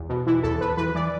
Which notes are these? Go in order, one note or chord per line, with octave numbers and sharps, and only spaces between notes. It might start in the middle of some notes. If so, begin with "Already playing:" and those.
Already playing: E2
B2
E3 E4
E2 A4
E2 B4
E3 B4
E3 D5